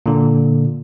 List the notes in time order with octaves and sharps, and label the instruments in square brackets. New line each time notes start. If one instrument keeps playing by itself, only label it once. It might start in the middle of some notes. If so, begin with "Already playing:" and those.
[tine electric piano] A#2 D3